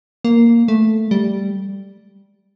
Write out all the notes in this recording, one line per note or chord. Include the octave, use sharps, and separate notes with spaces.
A#3
A3
G3